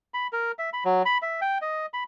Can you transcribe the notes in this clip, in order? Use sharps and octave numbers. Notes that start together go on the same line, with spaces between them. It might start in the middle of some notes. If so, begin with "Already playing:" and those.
B5
A#4
E5
B5
F#3
B5
E5
G5
D#5
B5